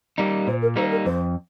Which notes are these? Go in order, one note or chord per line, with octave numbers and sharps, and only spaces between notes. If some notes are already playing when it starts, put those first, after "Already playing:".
G3 A#3 D#4
A#2 C5
A#4
G3 A#3 D#4 C5
A#4
F2 C5